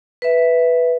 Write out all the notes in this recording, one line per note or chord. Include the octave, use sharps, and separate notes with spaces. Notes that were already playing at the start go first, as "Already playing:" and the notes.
B4 E5